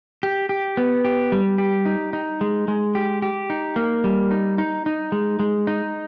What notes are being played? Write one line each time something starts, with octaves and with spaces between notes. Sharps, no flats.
G4
G4
B3
G4
G3
G4
D#4
D#4
G#3
G#3
G4
G4
D#4
A#3
G3
D#4
D#4
D#4
G#3
G#3
D#4